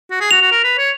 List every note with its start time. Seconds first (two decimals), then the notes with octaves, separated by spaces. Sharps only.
0.11 F#4
0.21 G#4
0.31 F#4 F7
0.41 F#4
0.51 A#4
0.64 B4
0.78 C#5